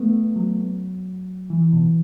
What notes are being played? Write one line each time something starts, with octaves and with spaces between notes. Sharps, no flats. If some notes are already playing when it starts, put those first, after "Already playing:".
Already playing: A3 B3
F#3
E3
B2